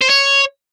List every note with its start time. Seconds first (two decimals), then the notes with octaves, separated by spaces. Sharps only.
0.01 C5
0.09 C#5